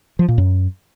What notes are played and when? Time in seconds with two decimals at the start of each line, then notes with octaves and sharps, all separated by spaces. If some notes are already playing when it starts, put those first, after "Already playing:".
0.19 F3
0.28 A#2
0.38 F#2